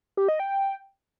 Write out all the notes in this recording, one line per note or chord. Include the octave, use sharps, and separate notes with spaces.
G4
D#5
G5